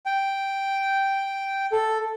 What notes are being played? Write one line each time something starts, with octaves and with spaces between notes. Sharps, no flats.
G5
A4